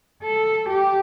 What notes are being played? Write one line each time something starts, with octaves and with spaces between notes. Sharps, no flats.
A4
G4